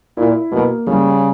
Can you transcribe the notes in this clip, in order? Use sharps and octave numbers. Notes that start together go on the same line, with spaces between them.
A#2 E4
B2 A#3
C#3 G3